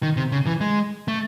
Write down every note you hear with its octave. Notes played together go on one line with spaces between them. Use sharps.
D#3
C3
C#3
E3
G#3
A3